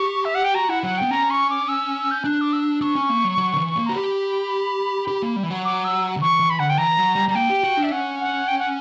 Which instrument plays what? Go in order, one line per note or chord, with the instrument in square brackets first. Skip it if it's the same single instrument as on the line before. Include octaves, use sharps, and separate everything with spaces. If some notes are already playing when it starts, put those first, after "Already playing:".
Already playing: [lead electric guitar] G4 [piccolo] C#6
[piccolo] E5
F#5
G5
[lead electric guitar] F#4 [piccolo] A#5
[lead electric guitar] E4 [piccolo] F#5
[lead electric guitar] F#3 [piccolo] F#5
[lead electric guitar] B3 [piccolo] G5
[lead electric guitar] C#4 [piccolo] A#5
[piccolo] C#6
D6
E6
G6
[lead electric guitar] D4 [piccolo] F#6
[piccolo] D6
E6
[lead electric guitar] D4 [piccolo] C#6
[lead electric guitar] C#4
A#3
F#3
F#3
D3
E3
A#3
[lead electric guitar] F#4 [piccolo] A#5
[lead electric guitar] G4 [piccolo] B5
[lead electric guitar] G4
A#3
G3
E3
F#3
[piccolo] D6
E6
[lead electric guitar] D3
[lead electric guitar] E3 [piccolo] C#6
[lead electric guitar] E3
[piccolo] B5
[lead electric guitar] D3 [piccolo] F#5
[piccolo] G5
[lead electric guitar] E3 [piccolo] A#5
[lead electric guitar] F#3
G3
[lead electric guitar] G3 [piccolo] A#5
[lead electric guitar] A#3 [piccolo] G5
[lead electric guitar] G4
F#4
D4
[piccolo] E5
[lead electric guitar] C#4 [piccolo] F#5
[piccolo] F#5
G5
F#5